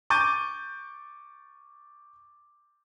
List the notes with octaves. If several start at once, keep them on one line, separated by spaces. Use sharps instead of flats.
C#6 D6 G6 A6 D#7